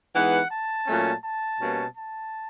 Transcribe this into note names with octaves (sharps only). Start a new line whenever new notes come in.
E3 G#3 B3 D#4 F#5
A5
A#2 F#3 A3 C#4
A5
B2 G3 A#3 C#4
A5